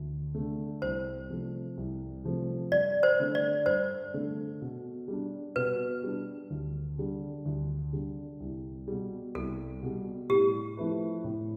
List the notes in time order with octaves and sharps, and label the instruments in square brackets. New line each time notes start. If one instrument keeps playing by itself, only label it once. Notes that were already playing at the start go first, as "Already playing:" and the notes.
Already playing: [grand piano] D2
D3 A3
[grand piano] C2 [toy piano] C5
[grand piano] C3 F3 A3
C2
C3 F3 A3
[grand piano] G2 [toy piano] D5
[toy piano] C5
[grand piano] D3 A3 D4 A4
[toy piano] D5
[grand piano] G2 [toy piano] C5
[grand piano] D3 A3 D4 A4
B2
G3 D4
[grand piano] B2 [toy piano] B4
[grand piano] G3 D4
D2
D3 G3
D2
D3 G3
C2
B2 G3
[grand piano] C2 [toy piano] A4
[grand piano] B2 G3
[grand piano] A2 [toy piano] G4
[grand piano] F3 A3 E4 B4
A2